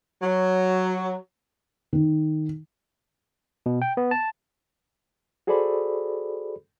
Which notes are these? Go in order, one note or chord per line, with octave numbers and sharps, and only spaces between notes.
F#3
D#3
B2
G5
B3
A5
F#4 G#4 A4 C5 D5 B5